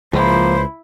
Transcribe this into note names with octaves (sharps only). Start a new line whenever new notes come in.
C#2 F3 A#3 E4 C5